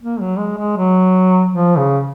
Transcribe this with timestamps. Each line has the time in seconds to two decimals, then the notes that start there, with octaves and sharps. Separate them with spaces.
0.02 A#3
0.20 F#3
0.39 G#3
0.57 G#3
0.77 F#3
1.52 F3
1.77 C#3